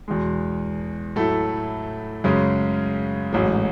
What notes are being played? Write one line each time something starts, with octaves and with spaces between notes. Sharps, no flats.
E2 B2 G#3
A2 F#3 A3 E4 A4
F#2 C#3 G#3 C#4
A1 G#2 F#3